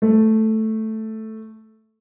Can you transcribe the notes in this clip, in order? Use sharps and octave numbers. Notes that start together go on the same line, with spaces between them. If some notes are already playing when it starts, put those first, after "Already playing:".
A3